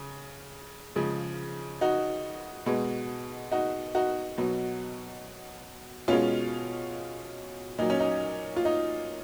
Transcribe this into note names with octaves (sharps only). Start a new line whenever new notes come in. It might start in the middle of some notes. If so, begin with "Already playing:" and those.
Already playing: C#3
C#3 F3 G#3
D#4 F#4
B2 G#3
D#4 F#4
D#4 F#4
B2 F#3
B2 G#3 C#4 F4
A#2 F#3 D#4
C#4
D#4
F4
D#4